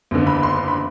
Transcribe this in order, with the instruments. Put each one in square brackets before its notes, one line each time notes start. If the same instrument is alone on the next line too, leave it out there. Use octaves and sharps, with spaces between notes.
[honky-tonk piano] F#1 E2 D3
B5
C6
B5